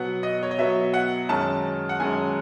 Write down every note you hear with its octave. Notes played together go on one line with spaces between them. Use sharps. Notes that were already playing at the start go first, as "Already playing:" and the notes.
Already playing: B2 F#3 B3 F#5
D#5
C#5
D#5
B2 F#3 B3 E5
F#5
F#2 D#3 G#3 C#4 A5
F#5
F#2 D#3 G#3 C#4 G#5